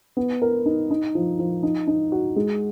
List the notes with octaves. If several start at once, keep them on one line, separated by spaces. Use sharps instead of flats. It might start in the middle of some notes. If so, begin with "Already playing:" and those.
B3
A#4
D#4
D#4
F3
F3
D#4
D#4
F#4
G#3